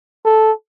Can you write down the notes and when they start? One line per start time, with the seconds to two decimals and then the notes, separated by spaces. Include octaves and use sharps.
0.25 A4